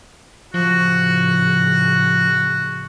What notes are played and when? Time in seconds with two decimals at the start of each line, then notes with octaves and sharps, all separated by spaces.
0.54 A2 C#3 F3 F#4